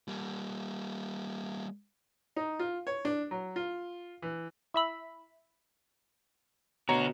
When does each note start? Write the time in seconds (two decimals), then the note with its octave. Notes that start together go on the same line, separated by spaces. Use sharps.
0.08 G3 A#3
2.36 D#4
2.59 F4
2.87 C#5
3.05 D4
3.31 F#3
3.56 F4
4.22 E3
4.74 E4 E5 B5
6.89 B2 D3 F#4 C#5 A#5